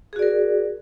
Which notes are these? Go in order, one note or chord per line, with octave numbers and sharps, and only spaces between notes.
F#4 G#4 A#4 D5